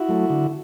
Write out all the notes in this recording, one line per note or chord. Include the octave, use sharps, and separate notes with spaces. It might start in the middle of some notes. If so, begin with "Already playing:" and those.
Already playing: E4 F#4
F#3 A3
D3